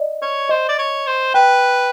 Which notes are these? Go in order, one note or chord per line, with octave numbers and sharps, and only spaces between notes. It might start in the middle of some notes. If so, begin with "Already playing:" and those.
Already playing: D5 D#5
C#5
C5 D#5
D5
C#5
C5
B4 G5